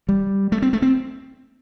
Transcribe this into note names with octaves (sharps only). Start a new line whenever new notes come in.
G3
A3
C4
A3
C4